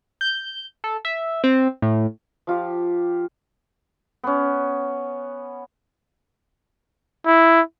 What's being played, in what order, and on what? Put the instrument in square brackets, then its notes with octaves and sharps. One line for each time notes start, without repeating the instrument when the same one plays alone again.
[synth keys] G6
A4
E5
C4
A2
[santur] F3 F4 G4
[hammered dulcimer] B3 C#4
[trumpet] E4